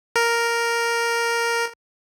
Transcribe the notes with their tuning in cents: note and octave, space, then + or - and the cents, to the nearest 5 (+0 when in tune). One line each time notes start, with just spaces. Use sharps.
A#4 +0